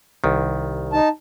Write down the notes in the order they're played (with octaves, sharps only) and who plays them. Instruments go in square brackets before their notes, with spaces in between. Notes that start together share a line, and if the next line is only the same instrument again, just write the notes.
[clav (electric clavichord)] C2 D#3
[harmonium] D#4 A5